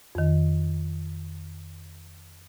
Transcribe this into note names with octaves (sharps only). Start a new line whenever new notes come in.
F2 D#3